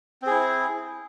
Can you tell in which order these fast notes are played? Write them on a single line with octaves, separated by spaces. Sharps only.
C4 G#4 E4